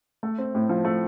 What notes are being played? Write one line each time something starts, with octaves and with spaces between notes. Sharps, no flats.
A3
C4
A2
F3
A3